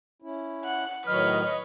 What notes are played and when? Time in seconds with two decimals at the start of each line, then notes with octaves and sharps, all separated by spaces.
0.22 C#4 E4
0.64 F#5 F#6
1.06 A2 D#3 F#3 B4 C#5 D#5 F6